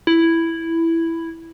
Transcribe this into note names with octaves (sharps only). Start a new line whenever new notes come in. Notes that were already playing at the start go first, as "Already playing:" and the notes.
E4